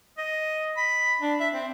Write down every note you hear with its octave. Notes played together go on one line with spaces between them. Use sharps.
D#5
B5
D4
E5
C4